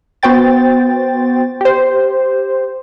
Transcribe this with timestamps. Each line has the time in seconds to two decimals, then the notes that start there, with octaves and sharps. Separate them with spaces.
0.23 B3 F#4 C5 G5 A6
1.61 G4 C5